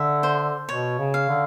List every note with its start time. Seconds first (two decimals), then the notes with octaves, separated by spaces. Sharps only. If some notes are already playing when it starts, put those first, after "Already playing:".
Already playing: D3 E5
0.23 C5
0.69 B2 C#5
0.99 C#3
1.14 F5
1.29 D3